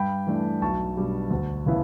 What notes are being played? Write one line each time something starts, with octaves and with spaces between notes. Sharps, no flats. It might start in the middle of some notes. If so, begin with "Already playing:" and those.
Already playing: G2 G5 B5
E3 A3 D4
B1 A5 C#6
B2 G3 D4
D2
C#3 E3 B3 E4